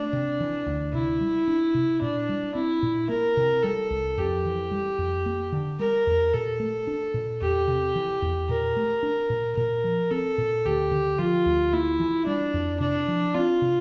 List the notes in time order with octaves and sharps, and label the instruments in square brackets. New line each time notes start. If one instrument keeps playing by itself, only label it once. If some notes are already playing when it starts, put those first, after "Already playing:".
Already playing: [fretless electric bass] A3 [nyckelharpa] D4
[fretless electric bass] C3
E3
D2
[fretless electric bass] C3 [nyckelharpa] E4
[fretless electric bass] G3
D4
C3
[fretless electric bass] A#2 [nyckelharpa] D4
[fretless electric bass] G3
[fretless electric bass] C4 [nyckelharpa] E4
[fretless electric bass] A#2
[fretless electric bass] A#3 [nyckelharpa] A#4
[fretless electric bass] C3
[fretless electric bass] G3 [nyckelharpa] A4
[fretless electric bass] C2
[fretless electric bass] F2 [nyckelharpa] G4
[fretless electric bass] E3
G3
F2
A#3
D3
[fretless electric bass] G3 [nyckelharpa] A#4
[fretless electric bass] E2
[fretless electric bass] A#2 [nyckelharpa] A4
[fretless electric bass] A3
D4
A#2
[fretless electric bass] E2 [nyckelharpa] G4
[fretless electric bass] C3
E3
E2
[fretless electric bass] A#2 [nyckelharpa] A#4
[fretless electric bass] A3
D4
A#2
[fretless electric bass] A#2 [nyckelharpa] A#4
[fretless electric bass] F3
[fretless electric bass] C4 [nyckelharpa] A4
[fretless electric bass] A#2
[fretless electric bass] D2 [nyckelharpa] G4
[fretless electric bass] D3
[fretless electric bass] F3 [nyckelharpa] F4
[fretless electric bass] D2
[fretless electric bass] A#3 [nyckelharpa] E4
[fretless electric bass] E3
[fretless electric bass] G3 [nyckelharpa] D4
[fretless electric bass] F2
[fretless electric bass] C3 [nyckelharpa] D4
[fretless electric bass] F3
[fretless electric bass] C4 [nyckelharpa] F4
[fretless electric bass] C3